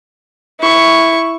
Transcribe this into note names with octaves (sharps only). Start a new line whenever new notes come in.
E4 C#6